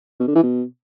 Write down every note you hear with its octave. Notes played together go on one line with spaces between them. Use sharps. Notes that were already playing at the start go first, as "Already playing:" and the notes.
B2
D3
E3
B2